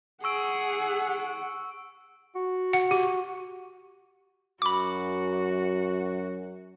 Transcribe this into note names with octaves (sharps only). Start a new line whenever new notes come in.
G#4 F#5 C#6 E6 D7
F#4
F#5
G4
F#2 F#4 B5 D6